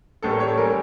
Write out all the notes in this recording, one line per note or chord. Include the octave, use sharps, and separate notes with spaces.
A1 A2 G3 A4
A#4
C#5
A4
E3 G3 A#4